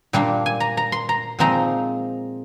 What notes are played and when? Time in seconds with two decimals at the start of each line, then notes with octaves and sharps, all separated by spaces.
0.13 A#2 G3 A#3 D4
0.46 G#5
0.60 A#5
0.77 A#5
0.92 C6
1.09 A#5
1.39 A#2 F3 G#3 C4 D#4 A#5